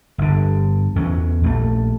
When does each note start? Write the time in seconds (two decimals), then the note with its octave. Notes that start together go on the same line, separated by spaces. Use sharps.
0.18 G1 D3
0.96 E2 C#4
1.44 A#1 A3